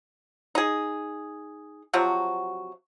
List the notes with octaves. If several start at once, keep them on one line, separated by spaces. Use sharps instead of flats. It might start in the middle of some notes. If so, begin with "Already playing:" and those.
D#4 G#4
C3 F3 F#3 F#4